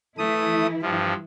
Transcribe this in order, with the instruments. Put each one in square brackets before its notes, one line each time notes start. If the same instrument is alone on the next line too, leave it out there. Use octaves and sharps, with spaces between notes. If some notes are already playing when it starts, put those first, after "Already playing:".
[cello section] E3 E4 [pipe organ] A3 D#6
[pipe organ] G2 F3